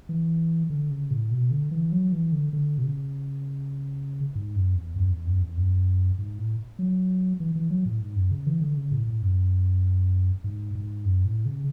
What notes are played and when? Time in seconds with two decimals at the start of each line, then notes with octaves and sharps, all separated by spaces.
0.09 E3
0.70 D3
0.91 C#3
1.11 A2
1.31 B2
1.51 D3
1.71 E3
1.92 F#3
2.12 E3
2.32 D3
2.53 D3
2.78 B2
2.83 C#3
4.35 G#2
4.56 F#2
4.76 E2
4.96 F#2
5.12 E2
5.27 F#2
5.42 E2
5.57 F#2
6.18 G#2
6.38 A2
6.79 F#3
7.40 E3
7.55 E3
7.70 F#3
7.86 A2
8.01 G#2
8.16 F#2
8.31 C#3
8.46 E3
8.61 D3
8.77 C#3
8.92 A2
9.07 A2
9.22 F#2
10.44 G#2
10.75 G#2
11.05 F#2
11.25 A2
11.46 C#3